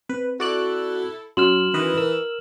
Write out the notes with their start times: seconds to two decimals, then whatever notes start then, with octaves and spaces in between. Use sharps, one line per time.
0.09 C4 B4
0.40 E4 F#4 A4 D5 F#6
1.37 F#2 C#4 F#4 C6 F6 E7 F#7
1.74 D#3 E3 B4 D#5
1.98 A#4 E6